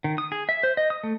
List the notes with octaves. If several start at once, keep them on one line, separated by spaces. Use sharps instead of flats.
D#3
D#6
G#4
E5
C5
D#5
D#6
A3